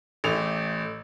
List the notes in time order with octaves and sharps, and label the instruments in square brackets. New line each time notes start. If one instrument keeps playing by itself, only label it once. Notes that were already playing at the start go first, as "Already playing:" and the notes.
[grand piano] A1 A3 F7